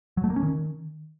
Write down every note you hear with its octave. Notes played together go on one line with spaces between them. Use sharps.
F#3
A3
A#3
C#4
D#3